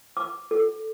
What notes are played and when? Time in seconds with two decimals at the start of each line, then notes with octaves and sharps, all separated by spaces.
0.17 D6
0.51 A4